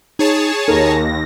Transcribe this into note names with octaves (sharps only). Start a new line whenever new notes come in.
D#4 G#4 C#5 A5
D#2 D#4 A#4 A#6